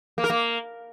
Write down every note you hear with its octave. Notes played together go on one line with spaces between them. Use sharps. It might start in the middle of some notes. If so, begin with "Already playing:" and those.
A#3
A#4
A#3